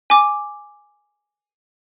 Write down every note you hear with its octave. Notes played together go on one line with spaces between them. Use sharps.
G#5 D6